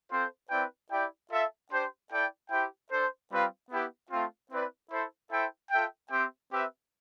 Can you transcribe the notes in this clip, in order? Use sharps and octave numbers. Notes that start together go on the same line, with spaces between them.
C4 F4 A4 C5
C4 E4 B4 D5 G5
E4 G4 D5 G5
F4 A4 E5
D4 G4 C5
E4 A4 D5 G5
E4 G4 C5 G5
D4 A4 C5
G3 C4 F4 B4 F5
B3 E4 G4 B4
A3 C4 F4
C4 E4 B4 D5
E4 A4 C5
E4 A4 C5 E5 G5
F4 A4 E5 G5
C4 G4 C5 E5 G5
C4 G4 B4 E5